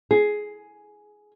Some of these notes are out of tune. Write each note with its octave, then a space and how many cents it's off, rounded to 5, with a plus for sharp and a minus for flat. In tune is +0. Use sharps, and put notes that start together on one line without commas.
G#4 +10